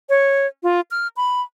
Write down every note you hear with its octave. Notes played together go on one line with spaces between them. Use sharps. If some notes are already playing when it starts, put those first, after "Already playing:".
C#5
F4
F6
B5